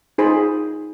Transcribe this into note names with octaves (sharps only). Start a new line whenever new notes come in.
D#4 G#4 C5 B5